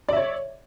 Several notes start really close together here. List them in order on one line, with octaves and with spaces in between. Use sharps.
D5 E5 C#5